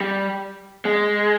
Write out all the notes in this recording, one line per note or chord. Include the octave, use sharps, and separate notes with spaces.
G3
G#3